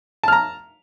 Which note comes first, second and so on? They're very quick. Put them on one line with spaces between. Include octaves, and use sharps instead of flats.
A5 F6 A#5